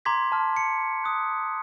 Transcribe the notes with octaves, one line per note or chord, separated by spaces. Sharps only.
A#5 C6 D6 G#6 B6
A5 F6
C#7
D#6 F#6